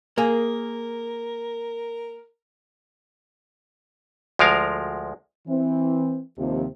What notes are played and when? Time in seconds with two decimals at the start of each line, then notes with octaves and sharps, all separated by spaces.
0.18 A#3 G#4 A#4
4.39 D2 F3 G#3 A#4 F5
5.48 E3 C4
6.38 D#2 C3 F3